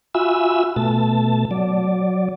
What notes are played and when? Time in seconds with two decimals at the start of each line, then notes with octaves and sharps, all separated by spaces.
0.15 F4 F#4 E5 G#5 B5 E6
0.76 B2 A3 A5
1.51 F#3 D5